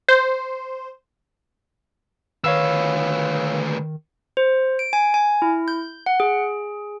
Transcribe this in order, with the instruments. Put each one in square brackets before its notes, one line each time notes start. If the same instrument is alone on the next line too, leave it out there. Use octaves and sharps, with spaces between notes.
[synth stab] C5
[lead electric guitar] D2 B4 [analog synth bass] D#3 [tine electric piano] C#5 F5 E6
[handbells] C5
D7
G#5
G#5
E4
G6
F#5
G#4